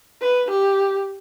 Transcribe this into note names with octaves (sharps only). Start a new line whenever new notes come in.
B4
G4